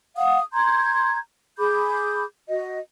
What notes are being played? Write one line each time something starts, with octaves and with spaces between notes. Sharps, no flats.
F5 F#5 D#6
A#5 C6 G6 G#6
G#4 B5 D6 G6
F#4 D#5